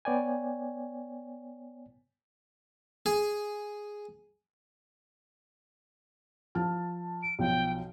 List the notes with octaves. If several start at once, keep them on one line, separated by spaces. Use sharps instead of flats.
B3 C#5 D5 G5 G#5
G#4
F3 A5 F6
D7
B1 F3 G5